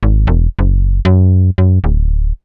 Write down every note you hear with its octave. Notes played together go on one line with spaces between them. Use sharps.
G#1
E1
F#1
F#2
F#2
D1